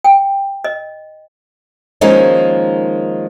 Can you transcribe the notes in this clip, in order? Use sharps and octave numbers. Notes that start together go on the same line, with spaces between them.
G5
D#5
D#3 F3 G#3 A#3 C#4 D#4